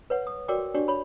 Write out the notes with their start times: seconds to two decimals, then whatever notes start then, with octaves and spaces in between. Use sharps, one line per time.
0.10 B4 C#5 F#5
0.27 D#6
0.48 F#4 A#4 C#5 D5 G5 D6
0.74 D4 F#4 G4 C#5 D5
0.88 C#5 B5